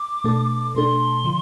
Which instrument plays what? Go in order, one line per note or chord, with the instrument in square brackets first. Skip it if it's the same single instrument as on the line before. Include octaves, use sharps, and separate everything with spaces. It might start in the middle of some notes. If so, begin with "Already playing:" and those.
Already playing: [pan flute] D6
[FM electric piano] B2 A3 D4 A4
[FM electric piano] B2 A3 D4 A4 [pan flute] C6
[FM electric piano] D3 F3